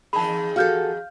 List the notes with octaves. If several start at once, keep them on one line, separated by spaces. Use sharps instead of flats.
E2 D#3 G#4 A5 B5
F#4 G4 A4 F5 F6 G6